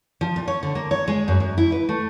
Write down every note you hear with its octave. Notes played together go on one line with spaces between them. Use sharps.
F3
A#2
C#5
D3
A#3
C#5
G#3
F#2
F#2
E4
B4
A3